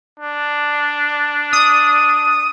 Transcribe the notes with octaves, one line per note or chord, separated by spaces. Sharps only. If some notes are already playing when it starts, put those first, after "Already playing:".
D4
D#6